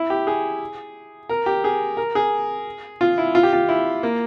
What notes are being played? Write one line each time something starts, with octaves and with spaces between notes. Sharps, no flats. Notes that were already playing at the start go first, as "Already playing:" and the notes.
Already playing: E4
G4
G#4
A#4
G4
G#4
A#4
G#4
F4
E4
F4
G4
F4
E4
A#3